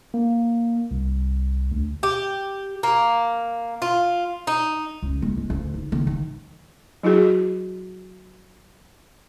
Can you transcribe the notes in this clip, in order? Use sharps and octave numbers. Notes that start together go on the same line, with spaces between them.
A#3
C2
D2
G4
A#3
F4
D#4
C#2
G#3
G#3
D2
D#4
D#3
D#3
F#3 E4 F#4 G#4